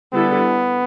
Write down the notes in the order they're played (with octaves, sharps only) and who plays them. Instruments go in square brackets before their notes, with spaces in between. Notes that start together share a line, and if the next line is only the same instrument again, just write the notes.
[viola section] D3 G3 E4 A4 [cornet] B3